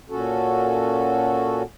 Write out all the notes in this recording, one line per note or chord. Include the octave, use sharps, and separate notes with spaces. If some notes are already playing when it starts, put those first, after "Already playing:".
A#2 C#4 F#4 A4